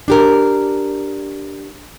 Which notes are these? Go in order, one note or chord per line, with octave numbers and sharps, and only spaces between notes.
D4 G4 A#4